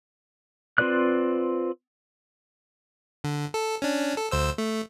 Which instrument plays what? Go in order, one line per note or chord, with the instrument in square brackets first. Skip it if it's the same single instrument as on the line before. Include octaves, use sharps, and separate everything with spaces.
[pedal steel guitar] C4 F4 B4 D5 F#6
[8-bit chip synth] D3
A4
C#4 D4
A4
D2 C5 E6
A3